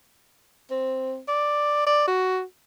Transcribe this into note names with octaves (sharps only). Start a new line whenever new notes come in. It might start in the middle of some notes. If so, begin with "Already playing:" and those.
C4
D5
D5
F#4